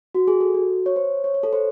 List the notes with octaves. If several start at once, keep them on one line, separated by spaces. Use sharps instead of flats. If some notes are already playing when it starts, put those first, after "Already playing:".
F#4
G#4
A4
F#4
C#5
C5
C#5
C#5
A4
C5